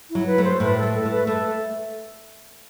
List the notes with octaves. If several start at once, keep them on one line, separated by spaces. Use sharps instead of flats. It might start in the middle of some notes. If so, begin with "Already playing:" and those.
F#3 E4
B4
A3
C5
A2 B4
A4
A3
A4
A3
B4
A3 A4